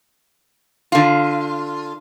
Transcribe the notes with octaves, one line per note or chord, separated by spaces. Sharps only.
D3 F4